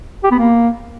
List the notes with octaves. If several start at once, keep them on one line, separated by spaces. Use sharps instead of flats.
G4
B3
A#3